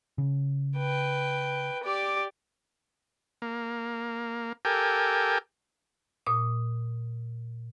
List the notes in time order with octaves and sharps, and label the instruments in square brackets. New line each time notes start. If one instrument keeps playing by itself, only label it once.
[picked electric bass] C#3
[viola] B4 G5
G4 D5
[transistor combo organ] A#3
G4 A4 A#4 G5 G#5
[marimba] A#2 D#6